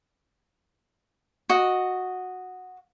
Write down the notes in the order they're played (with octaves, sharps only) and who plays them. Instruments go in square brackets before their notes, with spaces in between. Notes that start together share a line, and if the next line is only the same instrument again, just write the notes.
[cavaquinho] F#4 D#5